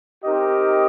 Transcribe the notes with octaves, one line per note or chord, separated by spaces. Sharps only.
C4 D#4 G4 A#4 D#5